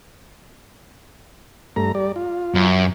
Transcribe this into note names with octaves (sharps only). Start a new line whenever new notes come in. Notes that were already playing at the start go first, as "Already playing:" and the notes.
G2 A3 A#5
G3 D5
F4
F#2